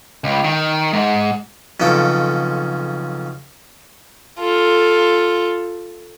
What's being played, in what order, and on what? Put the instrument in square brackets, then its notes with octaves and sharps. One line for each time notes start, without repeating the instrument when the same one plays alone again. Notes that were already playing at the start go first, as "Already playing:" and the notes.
[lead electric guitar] C#2
D#3
G#2
[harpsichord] B1 F2 C#3 A4 G5
[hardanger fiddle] F4 A4